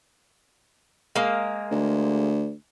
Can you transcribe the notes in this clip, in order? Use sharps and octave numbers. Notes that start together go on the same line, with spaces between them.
G#3 A#3
D2